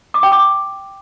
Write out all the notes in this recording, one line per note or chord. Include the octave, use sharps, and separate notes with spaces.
D6
G5
D6